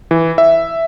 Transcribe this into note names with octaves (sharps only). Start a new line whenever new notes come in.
E3
E5